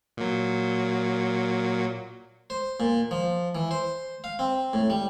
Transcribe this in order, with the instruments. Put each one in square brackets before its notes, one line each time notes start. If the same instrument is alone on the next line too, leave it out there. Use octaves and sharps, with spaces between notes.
[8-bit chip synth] A#2 F#3
[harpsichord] C5
A#2
F3
E3
C5
F5
C4
A2
G3